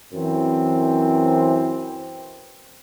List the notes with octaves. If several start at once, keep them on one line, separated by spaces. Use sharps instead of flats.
F#2 E3 C4